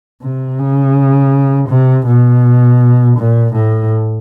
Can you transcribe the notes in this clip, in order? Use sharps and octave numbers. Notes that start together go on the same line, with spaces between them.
C3
C#3
C3
B2
A#2
A2